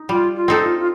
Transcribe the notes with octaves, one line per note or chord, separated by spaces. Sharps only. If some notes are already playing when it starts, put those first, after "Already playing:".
Already playing: D#4
G3 F4
F4
C4 D#4 A4
F4
F4